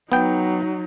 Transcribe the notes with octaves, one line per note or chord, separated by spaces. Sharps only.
F#3 B3 D#4 G5